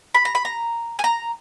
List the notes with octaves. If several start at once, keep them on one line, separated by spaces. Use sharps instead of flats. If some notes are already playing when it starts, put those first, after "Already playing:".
B5
A#5
B5
A#5
G#5
A#5